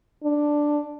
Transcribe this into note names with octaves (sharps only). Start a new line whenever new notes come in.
D4